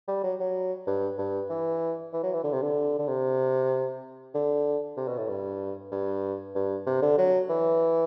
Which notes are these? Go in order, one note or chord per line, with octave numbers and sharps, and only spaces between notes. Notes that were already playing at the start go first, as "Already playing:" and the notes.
G3
F#3
F#3
G2
G2
E3
E3
F#3
E3
D3
C3
D3
D3
C3
D3
C3
B2
A2
G2
G2
G2
C3
D3
F#3
E3